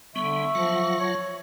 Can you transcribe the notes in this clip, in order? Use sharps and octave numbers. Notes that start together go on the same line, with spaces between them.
D3 G3 B3 E5 C#6
F3 F#3 F4 F#5
C#5